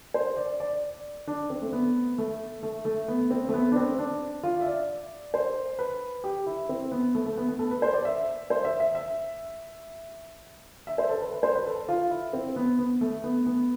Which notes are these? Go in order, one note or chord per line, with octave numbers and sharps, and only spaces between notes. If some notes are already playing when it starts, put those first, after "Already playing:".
C5
D5
D5
D4
C4
A3
B3
A3
A3
A3
B3
C4
A3
B3
D4
C4
D4
F4
E5
D5
C5
B4
G4
E4
C4
B3
A3
A3
B3
B3
A4
B4
C5
D5
E5
C5
E5
E5
E5
E5
C5
A4
B4
B4
C5
B4
A4
F4
E4
C4
B3
B3
A3
B3
B3